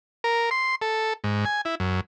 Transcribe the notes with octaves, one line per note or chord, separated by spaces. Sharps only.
A#4
C6
A4
G#2
G#5
E4
F#2